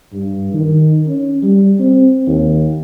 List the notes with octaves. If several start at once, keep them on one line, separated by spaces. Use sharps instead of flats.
G2
D#3
C#4
G3
C4
D#2